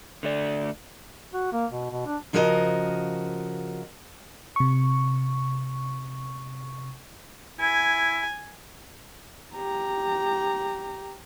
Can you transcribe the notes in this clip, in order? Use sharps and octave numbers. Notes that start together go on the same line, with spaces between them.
D3 A3 D5
F#4
A#3
B2
B2
D4
C#3 F3 F#4 A#4 B4 D#5
C3 C#6
E4 G#5
G4 A#5